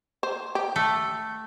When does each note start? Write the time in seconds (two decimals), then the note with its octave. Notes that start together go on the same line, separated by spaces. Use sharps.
0.23 C5
0.55 G4
0.76 A3